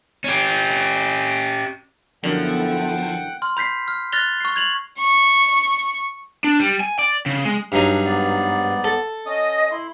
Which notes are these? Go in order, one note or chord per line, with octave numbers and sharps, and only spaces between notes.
C#4 G4
F#2 D3 F3 B3 E4 A4 F#5 G5
C6 F6
B5 G6 B6 C7
F6
F6 F#6 A6 A#6 F7 G7
C#6 C7
G#6 F7 F#7
C#6
D4
G3
G#5
D5
C#3
G#3
G2 F#3 D4 D#4
G#2 B3 D5
A4
C#4 D#5 D#6
E4 C6